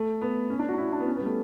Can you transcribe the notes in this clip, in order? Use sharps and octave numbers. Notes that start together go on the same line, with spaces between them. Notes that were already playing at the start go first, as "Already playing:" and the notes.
Already playing: A3
B3
C#4
D4
F#4
D4
E4
D4
B3
C#4
B3
G3
A3